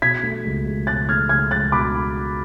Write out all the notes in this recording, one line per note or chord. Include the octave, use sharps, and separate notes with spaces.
B2 G#6 B6
A3
C#2
C#2
B2 F#6 A6
A3 F6 G#6
C#2 F6 G#6
C#2 F#6 A6
B2 B5 D6